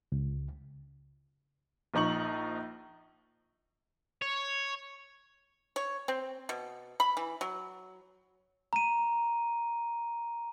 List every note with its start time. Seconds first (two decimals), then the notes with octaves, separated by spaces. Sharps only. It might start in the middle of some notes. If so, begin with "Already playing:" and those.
0.12 C#2
1.94 A#1 F3 D#4 C#6 F#7
4.22 C#5
5.76 C#5
6.08 C4
6.49 B2
7.00 B5
7.17 E3
7.41 F#3
8.73 A#5 D#7